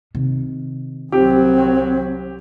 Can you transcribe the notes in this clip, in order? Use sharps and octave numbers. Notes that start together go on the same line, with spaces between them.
C3 D#3
C2 F#3 C4 G4